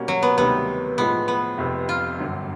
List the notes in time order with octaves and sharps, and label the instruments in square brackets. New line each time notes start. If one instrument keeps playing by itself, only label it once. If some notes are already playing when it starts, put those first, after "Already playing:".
Already playing: [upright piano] B2 G3 A#3 C#4 F#4
[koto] F#3
B3
[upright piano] D2 C3 D#3 G3 [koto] B3
[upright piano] A2 F3 G#3 [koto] B3
[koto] B3
[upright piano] F1 F2 C3
[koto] F4
[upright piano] G1 F#2 D3 F#3